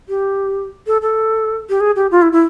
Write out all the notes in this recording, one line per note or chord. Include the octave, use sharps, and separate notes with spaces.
G4
A4
A4
G4
G#4
G4
F4
E4
E4